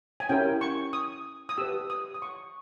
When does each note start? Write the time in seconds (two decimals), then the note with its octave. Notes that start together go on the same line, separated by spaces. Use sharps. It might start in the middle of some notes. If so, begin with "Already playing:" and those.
0.20 G#5
0.29 C#4 E4 G4 A#4 G5
0.61 C#6
0.93 D#6
1.49 D#6
1.58 G4 B4 E6
1.90 D#6
2.14 D#6
2.22 C#6